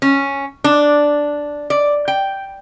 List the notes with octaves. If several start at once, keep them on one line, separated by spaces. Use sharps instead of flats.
C#4
D4
D5
G5